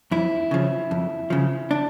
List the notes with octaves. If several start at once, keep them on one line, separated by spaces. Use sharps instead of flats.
F2 E4
C#3 F3
F2
C#3 F3
D4